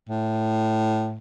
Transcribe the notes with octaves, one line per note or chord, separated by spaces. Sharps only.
A2